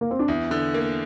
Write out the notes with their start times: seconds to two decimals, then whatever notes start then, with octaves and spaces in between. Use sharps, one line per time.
0.01 A#3
0.11 C4
0.19 D4
0.28 E2 E4
0.51 D3
0.74 A#3